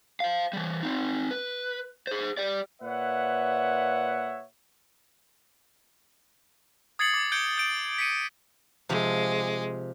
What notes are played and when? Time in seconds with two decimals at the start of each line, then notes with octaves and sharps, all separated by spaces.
0.20 C5 F5
0.53 E3 G3
0.83 C4 D#4
1.31 B4
2.07 G#4 C5
2.37 G4 D5
2.82 A#2 B4 C#5 E5 F#5
6.99 D#6 G#6 A6 C7 C#7 F#7
7.14 D6 A6
7.32 G6 G#6 C#7 D7 G7
7.58 G6 D7
7.98 B6 C#7 D#7
8.89 C3 F3 G#3